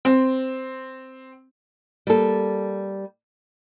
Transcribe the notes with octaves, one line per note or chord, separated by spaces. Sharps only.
C4
G3 A#3 A4